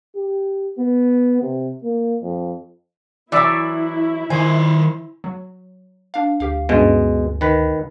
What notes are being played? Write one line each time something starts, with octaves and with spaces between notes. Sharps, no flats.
G4
B3
C3
A#3
F2
E3 F#3 E4 D5 E5
D#3 C5 E5 G#5
F#3
D4 F5
D2 G4 F5
G2 B2 G#3 C#4 D#5
D#3 B4